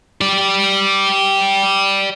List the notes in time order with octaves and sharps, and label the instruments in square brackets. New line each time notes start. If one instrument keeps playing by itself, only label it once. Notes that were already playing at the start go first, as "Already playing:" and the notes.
[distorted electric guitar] G4 D5